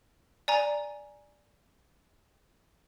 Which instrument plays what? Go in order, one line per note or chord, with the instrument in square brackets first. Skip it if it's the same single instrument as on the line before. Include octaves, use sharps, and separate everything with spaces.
[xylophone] D5 G#5 A#5